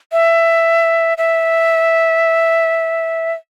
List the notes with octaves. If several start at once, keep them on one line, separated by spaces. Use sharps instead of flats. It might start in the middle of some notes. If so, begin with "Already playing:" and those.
E5
E5